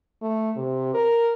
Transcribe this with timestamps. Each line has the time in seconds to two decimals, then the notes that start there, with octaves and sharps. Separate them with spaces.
0.22 A3
0.56 C3
0.94 A#4